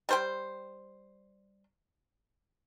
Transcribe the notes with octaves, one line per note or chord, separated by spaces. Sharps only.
G3 C5 G5